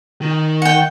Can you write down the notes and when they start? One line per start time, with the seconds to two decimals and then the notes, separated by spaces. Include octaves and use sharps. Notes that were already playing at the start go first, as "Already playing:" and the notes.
0.21 D#3
0.62 F#5 G5